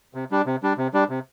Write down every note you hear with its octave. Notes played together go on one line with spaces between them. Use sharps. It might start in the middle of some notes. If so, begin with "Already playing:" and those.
C3
G3 D4
C3
G3 D4
C3
G3 D4
C3